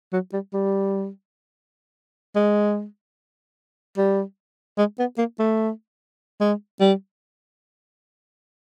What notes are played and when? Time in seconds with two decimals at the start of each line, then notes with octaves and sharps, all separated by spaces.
0.13 F#3
0.33 G3
0.53 G3
2.36 G#3
3.97 G3
4.78 G#3
4.99 B3
5.18 A#3
5.39 A3
6.40 G#3
6.80 G3